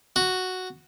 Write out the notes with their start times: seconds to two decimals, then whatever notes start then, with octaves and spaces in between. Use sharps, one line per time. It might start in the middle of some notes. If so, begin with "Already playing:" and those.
0.16 F#4